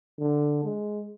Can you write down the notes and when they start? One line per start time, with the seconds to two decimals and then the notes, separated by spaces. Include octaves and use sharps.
0.19 D3
0.64 G#3